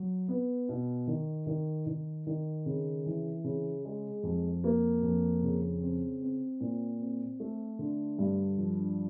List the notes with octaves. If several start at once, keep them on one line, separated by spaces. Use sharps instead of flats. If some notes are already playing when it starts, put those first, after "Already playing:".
Already playing: F#3
B3
B2
D#3
D#3
D#3
D#3
C#3
E3
C#3
G#3
F2
A#3
F2
C#3
C4
C4
A#2
C4
A3
D3
G2
F3